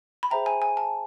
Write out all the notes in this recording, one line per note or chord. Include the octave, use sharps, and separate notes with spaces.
B5
G#4 C5 E5 G5 A#5
G#5
G#5
A5